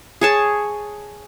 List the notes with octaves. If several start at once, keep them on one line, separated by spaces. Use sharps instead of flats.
G#4 C#5 A5